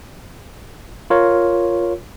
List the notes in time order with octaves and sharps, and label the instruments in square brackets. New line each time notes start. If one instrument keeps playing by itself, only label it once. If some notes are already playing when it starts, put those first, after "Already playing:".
[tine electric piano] F4 A#4 C#5